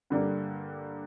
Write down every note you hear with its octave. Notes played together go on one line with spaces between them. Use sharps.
G2 D3 G3 A#3